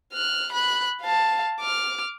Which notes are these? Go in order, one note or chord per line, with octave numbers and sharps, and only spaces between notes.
F6 F#6
B5 F#6
F5 A5
D6 F6